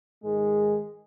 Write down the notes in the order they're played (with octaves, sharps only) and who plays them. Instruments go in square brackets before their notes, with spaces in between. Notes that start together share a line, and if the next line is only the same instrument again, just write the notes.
[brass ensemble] G#2 D#3 G#3